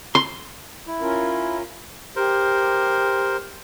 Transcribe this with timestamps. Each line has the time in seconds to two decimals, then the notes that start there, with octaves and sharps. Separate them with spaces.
0.15 C6
0.87 E4
1.01 C#4 F4 A#4
2.16 G4 A#4 C5